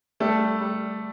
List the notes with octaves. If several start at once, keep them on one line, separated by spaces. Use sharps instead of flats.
G3 A3 A4
G3